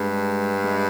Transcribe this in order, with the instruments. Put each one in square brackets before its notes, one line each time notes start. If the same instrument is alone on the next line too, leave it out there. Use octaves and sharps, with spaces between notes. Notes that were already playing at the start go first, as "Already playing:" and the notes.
Already playing: [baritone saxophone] G2 [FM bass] G#3
[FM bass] G#3